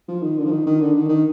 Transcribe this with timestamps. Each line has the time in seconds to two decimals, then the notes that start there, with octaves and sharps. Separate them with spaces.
0.08 F3
0.23 D#3
0.38 D3
0.45 F3
0.51 D#3
0.67 D#3
0.80 D3
0.95 D#3
1.09 D#3